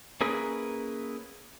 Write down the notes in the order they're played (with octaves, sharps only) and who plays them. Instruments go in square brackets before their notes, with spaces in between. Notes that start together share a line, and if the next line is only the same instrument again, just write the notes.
[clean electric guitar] A#3 C#4 E4 G#4 A#4 B4